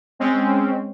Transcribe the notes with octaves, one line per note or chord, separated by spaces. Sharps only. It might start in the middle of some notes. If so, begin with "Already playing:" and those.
G#3 C4 C#4